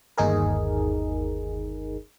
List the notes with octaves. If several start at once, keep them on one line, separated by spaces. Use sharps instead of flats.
G1 D#2 D#4 G#4 A#4